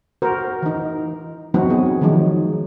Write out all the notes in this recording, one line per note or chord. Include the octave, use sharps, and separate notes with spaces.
F#4 A#4 C5
E3 D#4
E3 F#3 B3 C4 D#4 F#4
G#4
D#3 F3 F#3 G#3 D#4